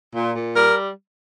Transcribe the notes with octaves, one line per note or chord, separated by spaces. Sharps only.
A#2
A#2
G3 A#4